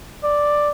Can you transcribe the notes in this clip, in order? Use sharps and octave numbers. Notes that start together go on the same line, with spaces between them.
D5